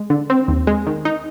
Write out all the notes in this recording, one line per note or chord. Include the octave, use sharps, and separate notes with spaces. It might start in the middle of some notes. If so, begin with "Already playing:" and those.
Already playing: G#3
D3
C4
D#2
G#3
D#3
D#4